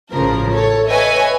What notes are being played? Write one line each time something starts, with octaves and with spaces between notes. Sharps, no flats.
A1 C#3 F3 A#4
A4 C#5
B4 C#5 D#5 E5 G#5